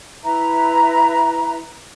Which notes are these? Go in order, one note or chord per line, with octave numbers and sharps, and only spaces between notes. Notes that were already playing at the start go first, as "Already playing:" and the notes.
E4 B4 E5 A#5